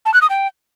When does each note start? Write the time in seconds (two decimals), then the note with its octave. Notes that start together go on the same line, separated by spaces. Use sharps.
0.05 A5
0.14 F#6
0.22 D#6
0.30 G5